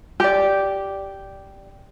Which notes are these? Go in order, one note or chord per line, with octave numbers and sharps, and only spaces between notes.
G4 D5